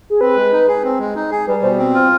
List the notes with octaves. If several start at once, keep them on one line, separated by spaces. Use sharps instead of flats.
G#4
C4 B4
G#3
D#4
G#4
C4
G#3
D#4
G#4
G3 B4
B2 C5
C4
F4